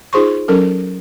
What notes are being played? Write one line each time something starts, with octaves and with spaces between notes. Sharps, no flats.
D#4 F4 G#4 C5 C6 C#6
F#3 C#4 A4 A#4